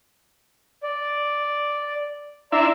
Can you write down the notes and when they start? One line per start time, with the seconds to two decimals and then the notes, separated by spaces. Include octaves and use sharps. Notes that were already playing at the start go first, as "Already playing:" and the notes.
0.83 D5
2.52 D4 E4 D5 E5 A#5 C6